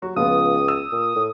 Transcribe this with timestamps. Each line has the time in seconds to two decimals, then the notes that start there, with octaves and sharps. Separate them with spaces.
0.02 F#3 F#4
0.16 C#2 F3 B3 D#6
0.68 E6
0.92 A#2
1.16 A2